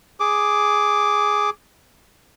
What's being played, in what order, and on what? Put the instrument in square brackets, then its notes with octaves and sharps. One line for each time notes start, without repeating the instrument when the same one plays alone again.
[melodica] G#4 D6